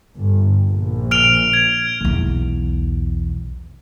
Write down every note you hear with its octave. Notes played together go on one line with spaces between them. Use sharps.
G1
A#1
F6 D7 F7
G#6
B1 E2